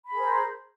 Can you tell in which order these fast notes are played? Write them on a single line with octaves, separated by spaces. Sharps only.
B5 G#4 A#4 C5